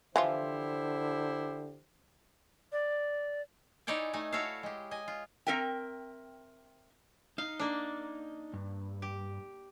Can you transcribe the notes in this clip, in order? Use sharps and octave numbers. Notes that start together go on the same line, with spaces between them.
D3 E3 F3 E4 F4 G4 C5
D5
D#4 E4 C#5 D5 G5 G#5
A3 D#4 G#5
E4 F#4 A4 C#5 E5 F5
G#3 G4
D#5 G#5
F4
C4 A#4 E5 G5
D#4 F5
A#3 D4
G2
G4